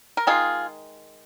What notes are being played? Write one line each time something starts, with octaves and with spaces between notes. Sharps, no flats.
A#4
D#3 G#3 F4 G#4